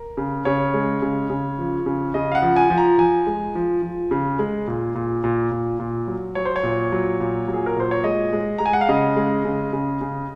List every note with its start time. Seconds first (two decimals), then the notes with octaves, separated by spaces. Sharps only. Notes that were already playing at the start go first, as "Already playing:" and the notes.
Already playing: A#4
0.17 C#3
0.45 C#3 C#5
0.74 G#3
1.02 C#3
1.30 C#3
1.59 F3
1.86 C#3
2.14 C#3 D#5
2.31 F5
2.35 F#5
2.42 F3
2.56 G#5
2.70 F3
2.78 A#5
2.98 F3 G#5
3.27 G#3
3.55 F3
3.82 F3
4.11 C#3
4.39 G#3
4.67 A#2
4.95 A#2
5.24 A#2
5.52 A#2
5.80 A#2
6.08 F#3
6.35 F#3 C#5
6.45 C5
6.56 C#5
6.63 A#2
6.92 F#3
7.20 A#2
7.48 F#3
7.54 G#4
7.66 A#4
7.76 A#2 C5
7.91 C#5
8.04 G#3 D#5
8.33 G#3
8.58 G#3 A#5
8.66 G#5
8.73 F#5
8.81 F5
8.89 C#3 D#5
9.16 G#3
9.45 C#3
9.73 C#3
10.01 C#3